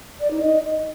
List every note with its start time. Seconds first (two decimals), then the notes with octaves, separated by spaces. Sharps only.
0.20 D5
0.31 D#4
0.41 D#5